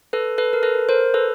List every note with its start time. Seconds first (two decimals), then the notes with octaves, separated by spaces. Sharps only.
0.13 A4 B4
0.38 A4 B4
0.53 A#4
0.63 A4 B4
0.89 A#4 C5
1.14 A4 B4